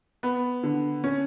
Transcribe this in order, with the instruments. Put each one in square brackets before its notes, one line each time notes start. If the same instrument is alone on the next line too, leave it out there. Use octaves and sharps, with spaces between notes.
[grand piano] B3
D3
C#4